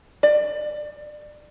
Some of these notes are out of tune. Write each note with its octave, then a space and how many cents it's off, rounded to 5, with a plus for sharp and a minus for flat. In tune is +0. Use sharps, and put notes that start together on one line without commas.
D5 +25